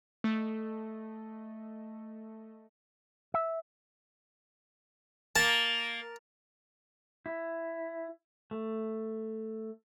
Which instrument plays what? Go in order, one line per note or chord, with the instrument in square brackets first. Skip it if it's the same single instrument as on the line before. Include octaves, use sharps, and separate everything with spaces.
[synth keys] A3 A4 D#5
[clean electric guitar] E5
[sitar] A#3 [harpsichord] A5
[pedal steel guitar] E4
A3